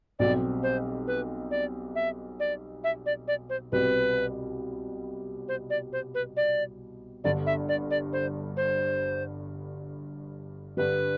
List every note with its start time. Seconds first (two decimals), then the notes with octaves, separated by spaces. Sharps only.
0.19 B1 B2 G3 C4 G4 D5
0.63 C5
1.07 B4
1.51 D5
1.95 E5
2.40 D5
2.84 E5
3.06 D5
3.28 D5
3.50 C5
3.72 C2 B2 G3 C4 B4
5.48 C5
5.70 D5
5.93 C5
6.15 B4
6.37 D5
7.24 G1 G2 D3 D5
7.46 E5
7.69 D5
7.91 D5
8.13 C5
8.57 C5
10.77 G2 D3 G3 B4